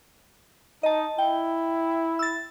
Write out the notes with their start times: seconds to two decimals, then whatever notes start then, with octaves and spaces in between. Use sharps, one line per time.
0.83 D#4 D#5 A5
1.18 E4 G5
2.19 E6 A6